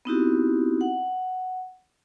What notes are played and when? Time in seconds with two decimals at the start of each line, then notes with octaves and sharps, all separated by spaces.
0.05 B3 C4 D#4 E4 F#4 G4
0.81 F#5